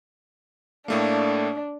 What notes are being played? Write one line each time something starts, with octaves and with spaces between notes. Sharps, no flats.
A2 A3 A#3 D4